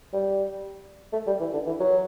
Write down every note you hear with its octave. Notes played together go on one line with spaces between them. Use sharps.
G3
A3
G3
E3
D3
E3
F#3